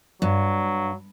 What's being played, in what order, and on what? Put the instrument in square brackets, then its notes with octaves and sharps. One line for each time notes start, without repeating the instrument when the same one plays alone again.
[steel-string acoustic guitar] G2 [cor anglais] F#3